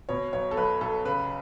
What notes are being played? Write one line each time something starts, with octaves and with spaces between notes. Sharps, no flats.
B2 C#5
B1 C#5
A4
B1 B4
B1 A4
C#3 B4